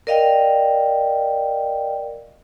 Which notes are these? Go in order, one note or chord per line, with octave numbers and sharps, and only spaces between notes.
A#4 D5 D#5 F5 G5